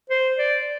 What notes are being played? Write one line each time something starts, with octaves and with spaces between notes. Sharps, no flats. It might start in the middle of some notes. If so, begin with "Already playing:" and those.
C5
D5